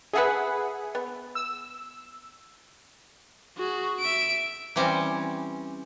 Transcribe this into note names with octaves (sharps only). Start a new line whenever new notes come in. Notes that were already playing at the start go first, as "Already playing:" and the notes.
C#4 G#4 A4 B4 E5 F#5
B3
E6
F#4 G#4
E5 D7
E3 G3 C4 C#4